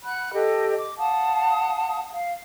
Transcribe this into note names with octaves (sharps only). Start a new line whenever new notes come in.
F#5 B5 F#6
G4 A4 D#5
D6
F5 F#5 A5 D#6
F5